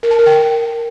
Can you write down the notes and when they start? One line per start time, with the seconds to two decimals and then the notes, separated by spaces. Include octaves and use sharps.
0.03 A#4
0.11 A5
0.19 A#4
0.26 G5